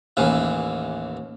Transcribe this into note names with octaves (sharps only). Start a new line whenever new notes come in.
A1 D#2 E3